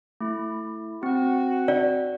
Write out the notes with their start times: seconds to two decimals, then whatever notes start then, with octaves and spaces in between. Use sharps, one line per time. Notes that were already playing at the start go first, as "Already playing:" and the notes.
0.21 A3 E4
1.03 C4 F#4 F#5
1.68 D5